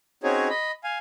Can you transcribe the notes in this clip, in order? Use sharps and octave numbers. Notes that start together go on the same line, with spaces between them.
C4 C#4 D#4 F#4 G#4 C#5
D#5 B5
F5 G#5